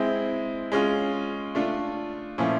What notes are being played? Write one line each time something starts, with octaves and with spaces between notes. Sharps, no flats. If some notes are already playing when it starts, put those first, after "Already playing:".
Already playing: G#3 C4 E4
G#3 C#4 F4
A3 D4 F4
A#2 F3 A3 C#4 E4